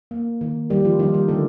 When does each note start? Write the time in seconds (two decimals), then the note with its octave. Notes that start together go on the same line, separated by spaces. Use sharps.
0.11 A#3
0.41 D#3
0.70 D#3 G3 G4
0.85 F3 F4
0.99 D#3 G3 D#4
1.14 G3 G4
1.28 D3 A3 A4